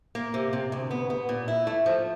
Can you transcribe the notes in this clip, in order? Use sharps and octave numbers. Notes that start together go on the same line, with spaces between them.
A#3
C3
C3
D2
B3
B3
A#2
E4
A3
F3